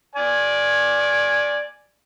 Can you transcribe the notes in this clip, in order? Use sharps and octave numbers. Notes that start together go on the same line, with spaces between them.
D5 G#5